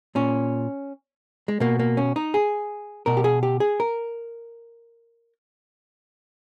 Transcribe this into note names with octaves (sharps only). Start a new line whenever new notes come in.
A#2 C#4
G#3
B2 A#3
A#3
C#4
D#4
G#4
B2 A#4
G4
G#4
G4
G#4
A#4